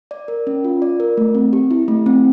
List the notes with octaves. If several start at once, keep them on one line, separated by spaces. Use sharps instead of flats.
D5
A#4
C#4
F4
D5
A#4
A3
C4
G4
E4
A3
C4